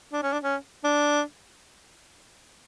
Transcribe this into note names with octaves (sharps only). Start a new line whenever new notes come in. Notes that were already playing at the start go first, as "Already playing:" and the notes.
D4
C#4
D4
C#4
D4